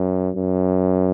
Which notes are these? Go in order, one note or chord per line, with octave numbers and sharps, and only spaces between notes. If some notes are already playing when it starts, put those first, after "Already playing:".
Already playing: F#2
F#2